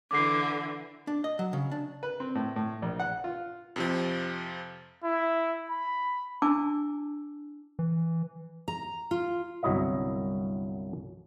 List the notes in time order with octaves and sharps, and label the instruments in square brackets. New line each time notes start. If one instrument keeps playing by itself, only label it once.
[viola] D3 E3 [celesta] D6 C7
[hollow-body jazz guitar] D4
D#5
F#3
C#3
D4
[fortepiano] B4
C4
A2
A2
A#1
F#5
F4
[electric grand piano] F2 C3 F3
[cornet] E4
B5
[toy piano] D4 E4 G#5 A5 D6 E6
[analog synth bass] E3
[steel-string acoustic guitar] A#5
F4
[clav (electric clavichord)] G1 C2 F#3 E4 D#5 E5